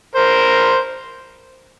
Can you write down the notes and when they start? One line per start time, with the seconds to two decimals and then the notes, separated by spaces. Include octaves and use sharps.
0.15 A#4 C5